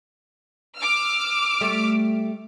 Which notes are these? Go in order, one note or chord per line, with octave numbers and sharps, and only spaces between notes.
D6 E6 F6
G3 A3